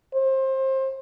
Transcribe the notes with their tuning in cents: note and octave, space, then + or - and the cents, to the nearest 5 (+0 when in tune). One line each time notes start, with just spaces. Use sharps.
C5 +25